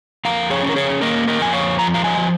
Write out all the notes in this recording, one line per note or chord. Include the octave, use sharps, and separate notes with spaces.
F2 F5 A#5
G#4 C#5
C#4
A#4
G#4 C#5
A#3 A#4 D#5
A#4 D#5
F2 G#5
C#5 F5
F3 A#5
F5 A#5
D#5 G#5
F3